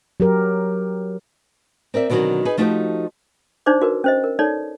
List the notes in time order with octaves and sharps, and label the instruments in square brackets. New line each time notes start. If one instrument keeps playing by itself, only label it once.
[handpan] F#3 G4 A#4
[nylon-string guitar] C4 A#4 D5 E5
B2 D3 D#3 F3 F#3 C4
D#4 G#4 B4
F3 A3 D#4 F#4 G4 C5
[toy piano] D4 D#4 C5 D5 D6
F#4 A#4 B4
C#4 C5 D#5
A#4
D#4 A4 C#5 D5